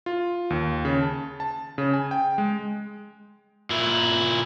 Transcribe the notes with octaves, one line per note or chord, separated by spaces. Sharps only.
F4
D#2
C#3
A5
A5
C#3
G#5
G5
G#3
A#2 E4